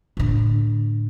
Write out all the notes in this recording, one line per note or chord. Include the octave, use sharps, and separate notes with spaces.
A2 D3